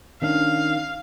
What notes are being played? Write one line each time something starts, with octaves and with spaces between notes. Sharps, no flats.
D#3 C#4 D4 F5